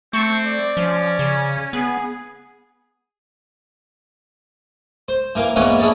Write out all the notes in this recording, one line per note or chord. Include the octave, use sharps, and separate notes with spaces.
A3 C4 C#6
D5
F3 C#4
C#3
B3 G#4
C5
E3 A#3 F5 D6
E2 G#2 E3 A#3 B3 C#4
D4 E4 G#4 C#5 D5